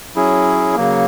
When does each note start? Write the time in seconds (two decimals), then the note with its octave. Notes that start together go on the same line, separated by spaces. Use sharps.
0.15 F#3 C#4 E4 G#4
0.75 C#3 F#3 A#3